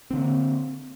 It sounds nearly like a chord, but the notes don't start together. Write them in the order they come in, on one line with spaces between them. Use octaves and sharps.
C4 D3 A#3